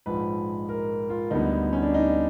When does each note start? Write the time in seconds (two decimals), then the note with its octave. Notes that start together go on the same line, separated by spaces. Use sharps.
0.06 A#1 G#2 F3 G#3 B4
0.69 A#4
1.10 F4
1.31 D2 D3 G3 B3 D#4
1.73 C#4
1.83 D4
1.94 D#4